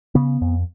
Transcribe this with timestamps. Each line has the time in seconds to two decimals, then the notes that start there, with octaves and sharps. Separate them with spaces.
0.15 C#3 B3
0.42 F2